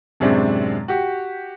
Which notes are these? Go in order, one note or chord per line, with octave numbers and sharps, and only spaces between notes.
F#2 A2 C3 G#3 C4 D4
F#4 G4